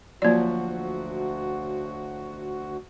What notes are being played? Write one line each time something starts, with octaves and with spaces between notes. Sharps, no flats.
D2 F3 F#3 A#3 F#4 D5